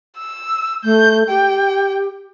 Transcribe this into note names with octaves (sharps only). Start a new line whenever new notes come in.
E6
A3 G6
G4 G5